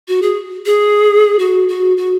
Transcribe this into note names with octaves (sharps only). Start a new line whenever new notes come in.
F#4
G#4
G#4
F#4
F#4
F#4